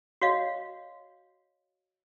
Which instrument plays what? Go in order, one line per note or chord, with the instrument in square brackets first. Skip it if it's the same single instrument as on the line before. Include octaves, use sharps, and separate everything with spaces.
[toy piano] F#4 C#5 D#5 F5